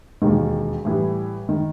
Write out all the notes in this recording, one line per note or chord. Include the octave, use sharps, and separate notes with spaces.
E1 D#2 D#3
A2 E3 G3
D#3